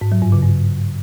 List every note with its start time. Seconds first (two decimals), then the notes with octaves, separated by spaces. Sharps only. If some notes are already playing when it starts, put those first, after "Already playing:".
0.01 G#2
0.12 F#3
0.22 G2
0.32 C#3
0.43 G2